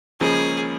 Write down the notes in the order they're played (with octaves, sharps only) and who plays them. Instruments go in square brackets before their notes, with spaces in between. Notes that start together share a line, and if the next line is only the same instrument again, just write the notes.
[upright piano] C#2 C#3 F3 A#3 C#4 [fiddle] G#4